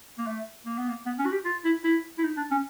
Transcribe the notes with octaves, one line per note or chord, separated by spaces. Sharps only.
A#3
A3
A#3
B3
A#3
B3
C#4
F#4
G4
F4
E4
E4
E4
D#4
D4
C#4